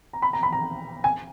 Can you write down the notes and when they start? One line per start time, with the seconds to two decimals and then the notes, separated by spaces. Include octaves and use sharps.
0.13 A#5
0.22 B5
0.33 A#5
0.43 B5
0.53 A#5
1.04 G#5